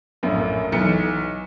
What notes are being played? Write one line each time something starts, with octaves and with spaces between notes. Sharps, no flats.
A#1 F#2 A2 A#3
B1 E3 C#7